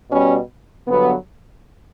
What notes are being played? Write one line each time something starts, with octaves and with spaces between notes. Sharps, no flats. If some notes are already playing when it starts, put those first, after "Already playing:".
B2 G3 C#4
G2 D3 F#3 B3